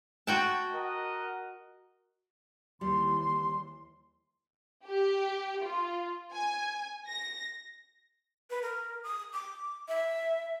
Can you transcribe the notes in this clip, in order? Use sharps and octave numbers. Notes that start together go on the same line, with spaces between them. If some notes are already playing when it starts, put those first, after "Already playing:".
F#4 G5 A5
A#4 D#5 F#5
D#2 E3 G3 C6
G4
F4
G#5
A#6
B4
A#4
D#6
D6
E5